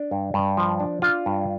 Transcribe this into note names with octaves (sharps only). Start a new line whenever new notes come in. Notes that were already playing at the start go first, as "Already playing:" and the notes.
Already playing: D4
G2
G2
F3
D4
D4 F4
G2